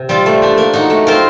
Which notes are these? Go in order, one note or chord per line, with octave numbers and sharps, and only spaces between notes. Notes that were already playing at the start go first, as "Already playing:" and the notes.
Already playing: C3
G3 C4 F4
A3
D4 G4
A#3
D#4 F#4
A3
C4 F4 A#4